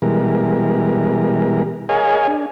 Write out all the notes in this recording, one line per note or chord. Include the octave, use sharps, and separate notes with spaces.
B2 E3 G3 G#3 A#4
G#4 A#4 C#5 D#5 F5 G#5
D4